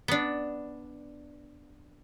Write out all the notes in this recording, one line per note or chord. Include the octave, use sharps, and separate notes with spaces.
B3 D4